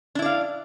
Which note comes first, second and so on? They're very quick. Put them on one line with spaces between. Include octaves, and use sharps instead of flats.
D4 E4 D5 F5